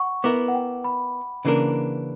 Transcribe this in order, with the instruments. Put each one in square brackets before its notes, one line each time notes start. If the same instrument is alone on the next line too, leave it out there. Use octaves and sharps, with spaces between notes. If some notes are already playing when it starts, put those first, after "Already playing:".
Already playing: [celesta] F#5 C#6
[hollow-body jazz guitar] B3 E4 A#4 [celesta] D6
[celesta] F#5
G5
B5
[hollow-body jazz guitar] C#3 E3 A#3 D4 A#4